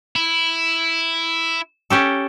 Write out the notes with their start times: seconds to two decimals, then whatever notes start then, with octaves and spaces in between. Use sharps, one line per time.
0.16 E4
1.90 C#4 G4 A4